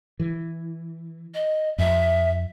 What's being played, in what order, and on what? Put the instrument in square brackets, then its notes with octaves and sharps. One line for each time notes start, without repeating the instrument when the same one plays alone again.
[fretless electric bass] E3
[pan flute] D#5
[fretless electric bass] F2 [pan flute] E5